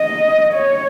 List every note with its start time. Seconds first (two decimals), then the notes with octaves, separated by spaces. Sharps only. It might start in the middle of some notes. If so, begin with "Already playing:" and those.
Already playing: D#5
0.55 C#5